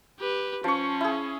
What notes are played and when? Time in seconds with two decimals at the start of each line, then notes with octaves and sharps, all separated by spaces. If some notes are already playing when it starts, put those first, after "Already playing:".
0.20 G4 B4
0.64 F3 C#4 C#6
1.01 E4 G#4